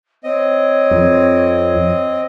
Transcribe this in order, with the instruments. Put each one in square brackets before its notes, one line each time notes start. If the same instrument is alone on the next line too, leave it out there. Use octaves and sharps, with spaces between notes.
[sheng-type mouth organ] C4 D#5 [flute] C#5
[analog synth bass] F2